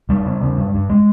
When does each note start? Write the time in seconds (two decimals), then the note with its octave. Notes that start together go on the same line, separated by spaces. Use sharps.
0.09 F2 G3
0.26 C#3
0.41 C#3
0.58 G2
0.75 G2
0.90 G#3